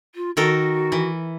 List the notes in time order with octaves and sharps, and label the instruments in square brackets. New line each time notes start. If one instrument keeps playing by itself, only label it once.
[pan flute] F4
[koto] D#3 A4 A#4 [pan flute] F#4
[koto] E3